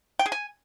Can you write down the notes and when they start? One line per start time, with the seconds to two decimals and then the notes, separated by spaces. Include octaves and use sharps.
0.19 G5
0.26 G#4
0.32 G#5